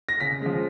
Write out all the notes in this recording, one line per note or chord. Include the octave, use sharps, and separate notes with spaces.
A#6
C#3 B6
F3 G#3